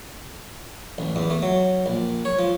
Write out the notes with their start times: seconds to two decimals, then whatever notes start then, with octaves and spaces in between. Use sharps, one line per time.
0.98 A1
1.16 E2
1.30 A3
1.42 F#3
1.86 A#1
2.25 C#5
2.39 F3